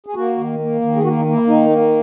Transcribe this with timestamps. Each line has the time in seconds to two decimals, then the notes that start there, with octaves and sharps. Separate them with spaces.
0.07 G#4
0.15 A#3 F#4
0.37 D#3
0.59 A#3
0.81 D#3
0.96 G#4
1.03 A#3 F#4
1.18 D#4
1.25 A#3
1.34 E4
1.47 D#3 D#4
1.69 A#3